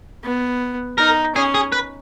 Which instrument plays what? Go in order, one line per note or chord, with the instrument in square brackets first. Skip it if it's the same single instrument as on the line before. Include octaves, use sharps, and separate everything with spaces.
[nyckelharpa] B3
[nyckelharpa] D#4 [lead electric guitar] A#4
[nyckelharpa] C#4 [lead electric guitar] G#4
[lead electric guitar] G#4
B4